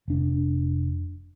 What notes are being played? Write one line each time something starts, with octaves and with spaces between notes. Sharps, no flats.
F1 D4